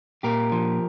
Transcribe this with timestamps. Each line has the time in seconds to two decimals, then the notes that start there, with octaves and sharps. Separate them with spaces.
0.23 A#2 G4 A#4
0.52 F3